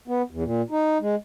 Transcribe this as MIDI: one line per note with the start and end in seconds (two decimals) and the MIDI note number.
0.08 0.22 59
0.31 0.44 40
0.44 0.62 46
0.70 0.98 63
1.00 1.15 56